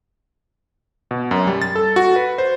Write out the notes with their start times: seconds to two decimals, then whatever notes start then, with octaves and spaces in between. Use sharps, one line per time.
1.11 B2
1.31 F#2
1.47 G3
1.62 A6
1.76 A4
1.96 F#4
2.16 B4
2.38 C5